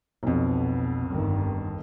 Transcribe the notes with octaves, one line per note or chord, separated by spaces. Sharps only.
B1 F2 B2
G1 G2 D#3